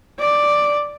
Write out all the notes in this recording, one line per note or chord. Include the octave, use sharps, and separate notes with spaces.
D5